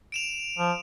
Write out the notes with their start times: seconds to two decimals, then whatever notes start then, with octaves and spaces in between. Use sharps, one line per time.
0.12 D7 E7 F7
0.58 F3